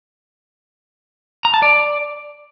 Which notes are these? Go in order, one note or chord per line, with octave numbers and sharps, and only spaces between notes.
A#5
A5
D5